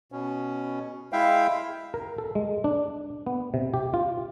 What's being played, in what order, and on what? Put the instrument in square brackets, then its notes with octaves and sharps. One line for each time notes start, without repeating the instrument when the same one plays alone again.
[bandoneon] B2 C#4
G#3 E4 E5 F5 G5
[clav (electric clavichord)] A#4
A4
G#3
D4
B3
C3
G4
F4